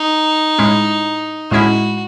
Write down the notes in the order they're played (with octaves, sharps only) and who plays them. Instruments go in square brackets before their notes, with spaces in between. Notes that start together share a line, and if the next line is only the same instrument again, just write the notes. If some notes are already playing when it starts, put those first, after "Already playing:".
Already playing: [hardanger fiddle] D#4
[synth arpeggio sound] A2 G#3 C#4 E4
[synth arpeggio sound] A2 G#3 C#4 E4 [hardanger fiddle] F#4